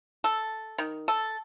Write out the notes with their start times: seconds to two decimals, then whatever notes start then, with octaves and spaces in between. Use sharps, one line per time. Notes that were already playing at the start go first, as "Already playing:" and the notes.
0.24 A4
0.78 D#3
1.08 A4